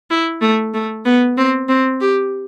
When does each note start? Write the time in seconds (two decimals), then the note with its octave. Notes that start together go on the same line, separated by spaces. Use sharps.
0.10 E4
0.41 A3
0.74 A3
1.05 B3
1.37 C4
1.69 C4
2.01 G4